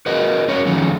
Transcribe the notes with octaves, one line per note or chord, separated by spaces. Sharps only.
F#4 G#4 A#4 B4 D#5
C#4 F#4 G#4 A#4 C#5
D#3 F3 A3 C#4 D#4 G#4